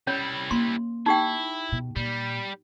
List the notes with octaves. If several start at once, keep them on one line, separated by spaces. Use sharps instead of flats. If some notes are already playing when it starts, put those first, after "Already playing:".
G3 C#4 E4 C#5
A#3 C6
D#4 E4 G4 G5
B2
A#2 G3